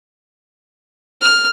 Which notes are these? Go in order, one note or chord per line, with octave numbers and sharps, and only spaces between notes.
F6